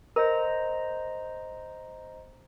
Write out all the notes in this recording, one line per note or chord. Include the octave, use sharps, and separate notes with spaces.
A#4 C5 D#5 A#5